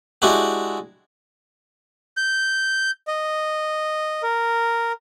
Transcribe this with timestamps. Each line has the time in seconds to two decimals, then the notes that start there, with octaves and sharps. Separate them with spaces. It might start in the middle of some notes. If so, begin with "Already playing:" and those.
0.22 G#3 D4 E4 F#4 G4
2.17 G6
3.08 D#5
4.23 A#4